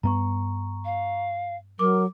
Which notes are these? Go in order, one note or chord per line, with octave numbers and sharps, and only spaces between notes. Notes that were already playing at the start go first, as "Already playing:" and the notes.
G2 B3 A#5 C#6
F5
F#3 A#4 D6